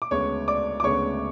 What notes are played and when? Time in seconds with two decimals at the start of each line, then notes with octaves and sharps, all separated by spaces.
0.02 D6
0.11 D2 C#3 G#3 B3 C#5 C#6
0.48 D5 D6
0.80 D6
0.83 D2 C#3 G#3 B3 C#5 C#6